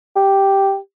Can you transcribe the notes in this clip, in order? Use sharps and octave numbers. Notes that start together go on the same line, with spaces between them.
G4